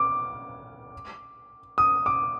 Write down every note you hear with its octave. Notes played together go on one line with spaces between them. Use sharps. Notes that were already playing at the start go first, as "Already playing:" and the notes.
Already playing: D6
D#6
D6